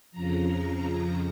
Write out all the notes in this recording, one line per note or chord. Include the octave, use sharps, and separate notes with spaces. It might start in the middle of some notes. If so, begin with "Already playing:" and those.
F2 C#3 F3 A#5